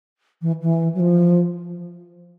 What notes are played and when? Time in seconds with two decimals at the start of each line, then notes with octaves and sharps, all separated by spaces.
0.42 E3
0.61 E3
0.94 F#3
1.00 F3